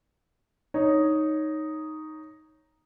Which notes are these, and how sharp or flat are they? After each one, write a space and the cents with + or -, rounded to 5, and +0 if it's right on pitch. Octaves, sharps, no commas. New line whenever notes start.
D#4 +0 C#5 +0